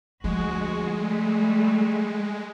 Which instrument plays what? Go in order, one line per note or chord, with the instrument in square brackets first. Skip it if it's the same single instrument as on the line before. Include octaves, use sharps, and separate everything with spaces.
[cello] D2 F#4 [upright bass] F3 [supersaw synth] G#3
[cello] G3 A3